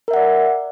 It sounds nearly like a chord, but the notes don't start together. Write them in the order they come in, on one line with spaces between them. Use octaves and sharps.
A#4 E5 F#5 D5